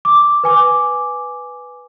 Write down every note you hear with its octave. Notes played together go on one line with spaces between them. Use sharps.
D6
B4 G#5 D6